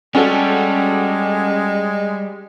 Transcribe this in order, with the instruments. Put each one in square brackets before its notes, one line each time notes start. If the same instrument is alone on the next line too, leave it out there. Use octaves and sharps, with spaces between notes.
[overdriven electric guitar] G3 [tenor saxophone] G#3 [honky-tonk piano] C#4 F#4 A4